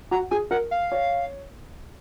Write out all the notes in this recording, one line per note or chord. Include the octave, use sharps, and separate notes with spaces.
F#4 A#5
G#4 G#5
A#4 F#5
F5
C#5